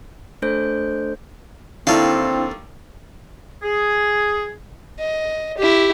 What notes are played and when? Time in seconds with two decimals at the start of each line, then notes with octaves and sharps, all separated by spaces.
0.42 A3 D4 A4 C5 G6
1.87 D#2 C4 D4 E4 A4 F5
3.63 G#4
5.00 D#5
5.58 E4 G4